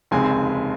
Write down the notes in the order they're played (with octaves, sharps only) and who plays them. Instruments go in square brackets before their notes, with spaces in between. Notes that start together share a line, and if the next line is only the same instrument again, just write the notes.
[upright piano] F1 D#2 C#3 G#3 C4 G#5 C6